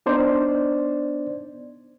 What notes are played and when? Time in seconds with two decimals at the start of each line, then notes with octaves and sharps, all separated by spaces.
0.06 B3 D4 D#4 C5 D5